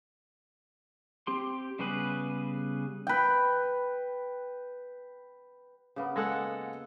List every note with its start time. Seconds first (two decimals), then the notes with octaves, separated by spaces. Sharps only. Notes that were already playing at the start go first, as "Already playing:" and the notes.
1.27 C4 G4 C6
1.79 C#3 G3 B3 G#4 B4
3.07 B4 G5
5.96 C#3 A#3 B3
6.16 G#3 A4 F#5